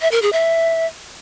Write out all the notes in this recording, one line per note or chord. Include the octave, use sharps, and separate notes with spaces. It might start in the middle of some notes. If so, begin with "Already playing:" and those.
E5
A#4
G#4
E5